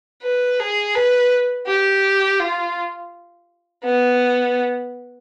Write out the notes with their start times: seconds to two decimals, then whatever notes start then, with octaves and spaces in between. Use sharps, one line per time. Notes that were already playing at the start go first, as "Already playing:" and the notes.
0.23 B4
0.59 G#4
0.95 B4
1.67 G4
2.40 F4
3.84 B3